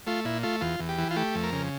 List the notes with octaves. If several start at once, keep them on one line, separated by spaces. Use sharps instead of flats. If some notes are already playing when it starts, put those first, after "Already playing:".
A3 F4
A#2 E4
A3 F4
E2 F4
E2
G4
E3
F4
A3 G4
F2
A#4
C#3